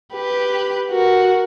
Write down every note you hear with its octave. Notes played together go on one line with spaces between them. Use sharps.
G4 B4
F#4 A#4